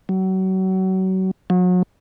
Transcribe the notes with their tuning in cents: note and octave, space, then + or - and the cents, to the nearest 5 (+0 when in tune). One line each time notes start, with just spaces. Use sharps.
F#3 +30
F#3 -35